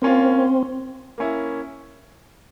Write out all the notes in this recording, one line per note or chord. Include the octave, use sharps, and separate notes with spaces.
A#3 C4 C#4 F4
A#3 C#4 E4